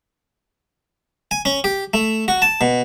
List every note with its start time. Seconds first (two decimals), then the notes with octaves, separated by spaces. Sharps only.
1.31 G#5
1.45 C#4
1.64 G4
1.94 A3
2.28 F#4
2.42 A5
2.61 B2